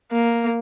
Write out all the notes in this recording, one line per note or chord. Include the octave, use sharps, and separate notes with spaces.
A#3